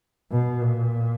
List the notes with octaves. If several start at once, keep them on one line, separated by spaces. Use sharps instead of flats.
B2
A#2